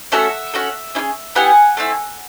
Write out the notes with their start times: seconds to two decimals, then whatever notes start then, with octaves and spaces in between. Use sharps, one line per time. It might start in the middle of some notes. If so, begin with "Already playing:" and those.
0.12 A3 C#4 F#4 A4 E5 F#5
0.54 C#4 F#4 A4
0.95 C#4 E4
0.99 G#4
1.35 B3 E4 G4 F#5 G#5
1.77 A3 C4 E4